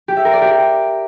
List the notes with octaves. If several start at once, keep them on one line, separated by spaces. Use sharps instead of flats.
G4
E5
A#4
D5
G4